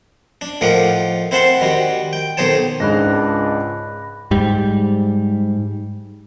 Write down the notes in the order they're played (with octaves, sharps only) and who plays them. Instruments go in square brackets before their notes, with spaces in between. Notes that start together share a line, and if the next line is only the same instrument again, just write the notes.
[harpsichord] D4
A2 F3 D#4 A#4 F#5 D6
C4 E4 C5 F#5 A5 C6
D#3 G3 F#4
G5
B1 D#3 D#4 C5 C#5 A5
[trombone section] C#2 D4 [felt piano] G#2 G#4 [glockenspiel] B5 F#6 A#6
[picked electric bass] G#2 G3